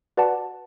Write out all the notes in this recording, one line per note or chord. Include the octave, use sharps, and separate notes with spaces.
F#4 B4 D5 F#5 A5